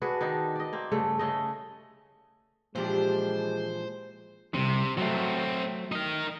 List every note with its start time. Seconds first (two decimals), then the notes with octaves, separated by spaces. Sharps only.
0.02 D4 F#4 G#4 B4
0.21 D#3 D4 D#4
0.56 D5 D#5
0.73 A#3 C4
0.92 G2 C#3 A3
1.19 C#3 A3 D#5
2.76 A#2 E3 F3 G#3 D4 G4 C5
4.54 C2 G2 C3
4.97 F#3 A3 C4 F#4
5.92 D#4 A#4